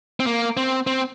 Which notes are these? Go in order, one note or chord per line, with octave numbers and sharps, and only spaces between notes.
C4
A#3
C4
C4